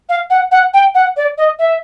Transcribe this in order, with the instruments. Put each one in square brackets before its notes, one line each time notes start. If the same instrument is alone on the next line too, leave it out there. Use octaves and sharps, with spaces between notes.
[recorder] F5
F#5
F#5
G5
F#5
D5
D#5
E5